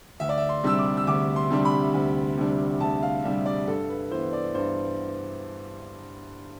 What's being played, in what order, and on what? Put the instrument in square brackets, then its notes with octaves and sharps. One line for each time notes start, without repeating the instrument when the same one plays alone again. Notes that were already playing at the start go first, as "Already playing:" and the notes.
[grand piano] D2 E5
D5
E5
C6
C3 G3 D4 E6
D6
E6
D2 D6
C6
C3 G3 D4
B5
D2
C3 G3 D4
D2 A5
F5
C3 G3 D4 E5
D5
G2 A4
B4
E3 B3 C5
D5
G2 C5